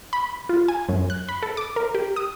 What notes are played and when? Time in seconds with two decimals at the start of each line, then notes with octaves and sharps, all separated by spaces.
0.13 B5
0.49 F4
0.68 G#5
0.89 F#2
1.10 F#6
1.29 B5
1.43 A4
1.57 D6
1.76 A#4
1.95 G4
2.16 D#6